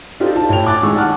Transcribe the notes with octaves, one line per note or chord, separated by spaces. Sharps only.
D4 D#4 F4 G4 A4 C5
F4 A5
A2 E4 C#5 G5 F7
G#5 D6 F#6 A6
D#3 G#3 C#6 E6
F#5 G#5 A5 D6 F6 F#6